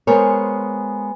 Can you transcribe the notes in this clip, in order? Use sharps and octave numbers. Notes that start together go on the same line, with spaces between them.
G#3 B3 A#4 C5 C#5